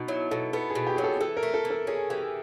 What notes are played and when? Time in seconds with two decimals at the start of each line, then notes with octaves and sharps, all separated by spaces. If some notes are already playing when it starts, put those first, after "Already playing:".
Already playing: B2 D#4
0.08 F#3 E4
0.31 B2 A4
0.53 B3 A4
0.70 G#4
0.75 B2
0.87 G4
0.96 F#3 G#4
1.03 A4
1.21 E3 A4
1.37 A#4
1.43 A3
1.54 A4
1.65 E3
1.70 A4
1.87 C#4 G#4
2.10 E3 G4